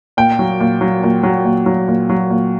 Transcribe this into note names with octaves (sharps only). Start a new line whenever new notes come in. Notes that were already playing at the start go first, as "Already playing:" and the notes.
A#2 G5
F#3
A#2
F#3
A#2
F#3
A#2
F#3
A#2
F#3
A#2